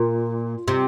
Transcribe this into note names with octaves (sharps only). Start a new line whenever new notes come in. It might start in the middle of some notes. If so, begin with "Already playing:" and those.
Already playing: A#2
C3